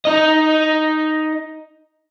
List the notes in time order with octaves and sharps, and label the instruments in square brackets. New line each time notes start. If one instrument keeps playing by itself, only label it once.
[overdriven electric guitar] D#4 D#5